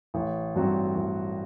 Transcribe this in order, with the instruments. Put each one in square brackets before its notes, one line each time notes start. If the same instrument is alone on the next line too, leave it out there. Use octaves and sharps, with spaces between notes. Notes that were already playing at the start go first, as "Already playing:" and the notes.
[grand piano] A1
G2 F#3 C4 F#4
A1